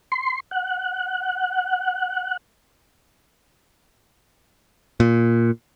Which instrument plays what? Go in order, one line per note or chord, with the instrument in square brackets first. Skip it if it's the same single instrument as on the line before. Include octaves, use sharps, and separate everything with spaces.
[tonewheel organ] C6
F#5
[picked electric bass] A#2